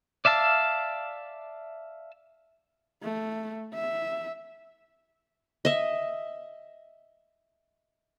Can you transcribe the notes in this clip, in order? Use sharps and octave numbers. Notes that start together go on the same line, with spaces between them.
D5 E5 F5 A5 E6
A3
E5
D#5 E5